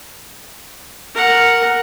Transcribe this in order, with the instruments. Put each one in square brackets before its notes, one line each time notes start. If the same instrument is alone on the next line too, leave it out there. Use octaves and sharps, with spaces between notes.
[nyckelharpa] A#4 F#5